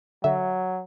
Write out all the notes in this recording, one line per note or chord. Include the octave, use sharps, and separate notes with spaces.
D3 F#3 E5